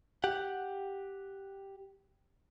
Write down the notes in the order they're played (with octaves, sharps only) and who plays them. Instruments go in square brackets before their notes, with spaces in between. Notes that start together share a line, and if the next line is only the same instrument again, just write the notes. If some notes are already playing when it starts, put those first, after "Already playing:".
[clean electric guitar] G4 F#5